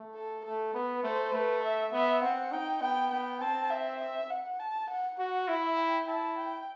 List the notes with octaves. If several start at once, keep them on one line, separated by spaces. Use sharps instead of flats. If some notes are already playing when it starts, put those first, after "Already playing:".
Already playing: A3
A4
A3 A4
B3 B4
A3 C5
A3 B4
E5
B3 E5
C4 F#5
D#4 G5
B3 G5
B3 G5
C4 A5
E5
E5
F#5
A5
F#5
F#4 F#5
E4 E5
G5
E4 A5
G5